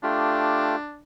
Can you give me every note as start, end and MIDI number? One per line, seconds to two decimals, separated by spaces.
0.03 0.76 57
0.03 1.02 62
0.03 0.76 65
0.03 0.76 67